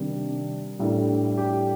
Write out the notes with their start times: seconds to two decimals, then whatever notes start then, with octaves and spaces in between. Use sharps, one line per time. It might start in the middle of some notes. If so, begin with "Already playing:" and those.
Already playing: C3 D#3 G3 D4
0.80 A2 G3 D4
1.38 G4